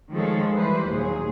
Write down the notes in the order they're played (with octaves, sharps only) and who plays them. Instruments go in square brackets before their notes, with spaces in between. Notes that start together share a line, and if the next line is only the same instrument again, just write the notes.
[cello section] D#3 F3 G#3 G#4 A4 C#5
E3 G3 B4 C5
D#2 A#2 F#3 G#4